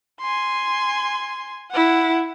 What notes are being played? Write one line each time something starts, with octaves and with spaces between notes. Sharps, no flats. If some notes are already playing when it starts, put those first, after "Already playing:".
G#5 C6
E4 F#5